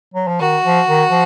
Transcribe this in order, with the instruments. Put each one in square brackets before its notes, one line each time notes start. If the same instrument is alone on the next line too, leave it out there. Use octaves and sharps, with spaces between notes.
[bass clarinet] F#3
F3
[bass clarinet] D#3 [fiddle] F#4
[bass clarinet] F3
D#3
F3